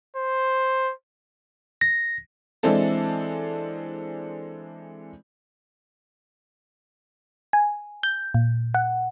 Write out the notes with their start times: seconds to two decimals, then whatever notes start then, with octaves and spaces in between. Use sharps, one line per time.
0.16 C5
1.81 A#6
2.63 E3 G#3 C4 D4 A4
7.53 G#5
8.03 G6
8.34 A#2
8.75 F#5